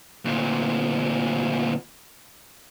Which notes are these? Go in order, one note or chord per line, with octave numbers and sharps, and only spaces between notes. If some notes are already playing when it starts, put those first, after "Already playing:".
D2 A#2